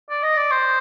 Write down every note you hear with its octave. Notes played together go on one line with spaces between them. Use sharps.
D5
D#5
D5
C5